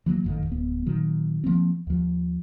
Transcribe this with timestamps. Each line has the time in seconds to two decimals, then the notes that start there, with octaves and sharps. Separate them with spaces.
0.06 E3 F#3 A#3
0.24 A1 F2 D#3
0.47 D1 B3
0.86 A#2 D#3 F#3
1.44 F3 A#3 C4
1.87 D#2 F3